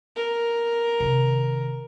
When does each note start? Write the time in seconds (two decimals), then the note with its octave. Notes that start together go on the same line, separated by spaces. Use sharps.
0.16 A#4
1.00 C3 D#3